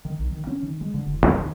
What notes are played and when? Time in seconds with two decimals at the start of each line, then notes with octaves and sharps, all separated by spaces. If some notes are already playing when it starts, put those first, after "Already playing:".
0.05 D#3
0.19 B1
0.32 D#3
0.47 C#4
0.63 D#3
0.81 G#3
0.94 D3
1.05 E1
1.26 D#2
1.40 D#3